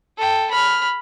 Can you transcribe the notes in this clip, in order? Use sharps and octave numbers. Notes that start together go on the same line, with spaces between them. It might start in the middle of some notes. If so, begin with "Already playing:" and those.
A4 G5
B5 F6